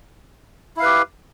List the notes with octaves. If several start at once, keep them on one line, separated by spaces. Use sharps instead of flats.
E4 G4 B4 F5